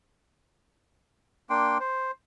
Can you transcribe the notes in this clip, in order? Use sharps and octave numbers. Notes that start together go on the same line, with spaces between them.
A#3 D4 G5 C6
C5